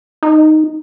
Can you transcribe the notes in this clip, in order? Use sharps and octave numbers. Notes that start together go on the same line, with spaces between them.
D#4